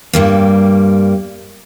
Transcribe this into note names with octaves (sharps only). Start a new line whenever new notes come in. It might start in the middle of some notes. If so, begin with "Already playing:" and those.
G2 G3 A#3